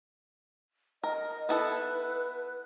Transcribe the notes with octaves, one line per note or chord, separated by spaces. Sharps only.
A#4 D#5
B3 E4 A4 B4